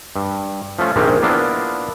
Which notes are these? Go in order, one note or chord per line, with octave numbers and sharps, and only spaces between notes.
G2
F3 A3 C#4 F4
A#1 G#2 D#3 G#3 C4 G4
A#3 B3 D4 E4 F4